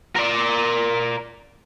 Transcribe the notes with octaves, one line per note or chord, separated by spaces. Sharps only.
A#4 D5